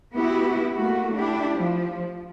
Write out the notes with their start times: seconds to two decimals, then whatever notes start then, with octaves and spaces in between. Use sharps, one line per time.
0.15 B3 E4 F#4 G4
0.75 A3 A#3 F#4
1.15 D4 E4 G4
1.54 F3